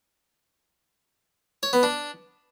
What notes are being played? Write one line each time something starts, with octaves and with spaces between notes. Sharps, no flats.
C#5
B3
D4